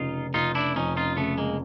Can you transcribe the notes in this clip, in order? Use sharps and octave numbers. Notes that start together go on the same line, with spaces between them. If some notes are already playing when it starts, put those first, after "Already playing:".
Already playing: F1 C#3 D#4 F4
F1 D#4 F4
D4 E4
F2 C#4 D#4
D#4 F4
C#3 A3 B3
G#3 A#3